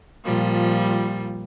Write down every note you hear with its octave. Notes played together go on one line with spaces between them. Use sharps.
A#2 F3 G3